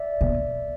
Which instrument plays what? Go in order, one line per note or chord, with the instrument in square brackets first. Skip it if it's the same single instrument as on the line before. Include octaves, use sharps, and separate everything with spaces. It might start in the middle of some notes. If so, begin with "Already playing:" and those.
Already playing: [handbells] D5 E5
[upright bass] B2